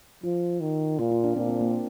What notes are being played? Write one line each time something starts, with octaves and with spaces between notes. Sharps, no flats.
F3 F4
D#3
A#2 F4
F4
D4
A#2 C4
C4
A#3